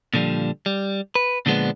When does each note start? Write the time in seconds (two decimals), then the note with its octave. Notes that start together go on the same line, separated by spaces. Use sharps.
0.14 A#2 D3 F3 G3
0.66 G3
1.15 B4
1.46 A#2 D3 F3 G#3 B3 D4